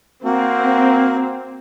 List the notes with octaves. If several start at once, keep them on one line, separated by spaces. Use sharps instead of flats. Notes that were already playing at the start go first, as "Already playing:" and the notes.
A#3 C4 F#4